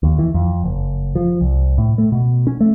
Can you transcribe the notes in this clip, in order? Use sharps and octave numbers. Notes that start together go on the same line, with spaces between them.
D#2
E3
F2
F#1
F3
C2
A2
A3
B2
C#4
A3